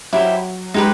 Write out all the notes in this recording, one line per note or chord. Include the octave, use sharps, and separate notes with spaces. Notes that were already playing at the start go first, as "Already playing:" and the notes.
F#3 E4 G4 C5
G#3 D#4 G4 B4